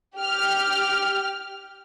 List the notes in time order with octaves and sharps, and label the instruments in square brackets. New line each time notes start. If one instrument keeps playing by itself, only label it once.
[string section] G4 F6